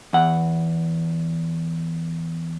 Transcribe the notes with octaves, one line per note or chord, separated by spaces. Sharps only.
E2 F#5